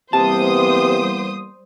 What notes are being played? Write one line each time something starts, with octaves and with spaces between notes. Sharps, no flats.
C3 E3 G3 A#3 B3 C5 A5 D#6